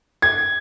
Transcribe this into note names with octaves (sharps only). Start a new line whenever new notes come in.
G#6